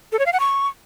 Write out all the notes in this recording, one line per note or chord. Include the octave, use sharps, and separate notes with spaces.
A4
C#5
F5
F#5
C#6